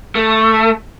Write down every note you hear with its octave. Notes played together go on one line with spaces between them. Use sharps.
A3